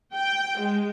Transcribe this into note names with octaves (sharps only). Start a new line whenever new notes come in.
G5
G#3